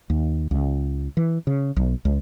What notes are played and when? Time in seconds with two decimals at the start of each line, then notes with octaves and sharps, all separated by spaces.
0.10 D#2
0.51 C#2
1.17 E3
1.47 C#3
1.76 B1
2.05 C#2